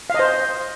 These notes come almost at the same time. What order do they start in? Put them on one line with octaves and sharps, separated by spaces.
F5 D#5 C5